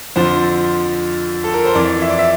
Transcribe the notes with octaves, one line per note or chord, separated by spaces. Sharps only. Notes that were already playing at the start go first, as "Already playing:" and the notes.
F2 D3 F3 C5
A4
A#4
C5
F2 E3 D5
E5
D5
E5